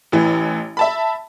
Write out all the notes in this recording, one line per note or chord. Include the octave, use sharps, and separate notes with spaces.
A1 E3
E5 A5 B5